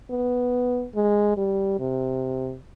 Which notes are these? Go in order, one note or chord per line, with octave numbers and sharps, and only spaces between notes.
B3
G#3
G3
C3